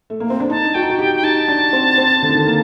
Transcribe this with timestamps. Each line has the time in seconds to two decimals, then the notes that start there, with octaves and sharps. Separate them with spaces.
0.10 A3
0.20 A#3
0.30 C4
0.40 D4
0.50 D#4 A5
0.74 F#4 G5
0.83 D#4
0.90 F#4
0.99 G4 G5
1.15 G5
1.23 D#4 A5
1.48 D4
1.73 C4
1.98 C4
2.22 D3
2.29 D#3
2.35 D3
2.47 A#3